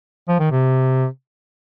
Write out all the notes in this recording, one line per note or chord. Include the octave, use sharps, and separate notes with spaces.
F3
D#3
C3